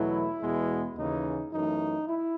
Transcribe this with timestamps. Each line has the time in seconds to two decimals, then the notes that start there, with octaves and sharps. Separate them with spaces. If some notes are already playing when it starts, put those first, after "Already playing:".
Already playing: E2 B2 F#3 A3 E4
0.40 E2 B2 G#3 B3
0.95 D#2 C#3 E3 D#4
1.51 F#2 E3 A3 D#4
2.07 E4